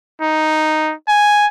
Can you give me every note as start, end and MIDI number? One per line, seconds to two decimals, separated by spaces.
0.22 0.94 63
1.09 1.47 80